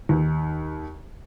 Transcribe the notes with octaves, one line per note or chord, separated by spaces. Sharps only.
D#2